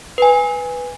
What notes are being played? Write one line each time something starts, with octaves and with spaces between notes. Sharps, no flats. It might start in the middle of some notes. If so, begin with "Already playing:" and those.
B4 G#5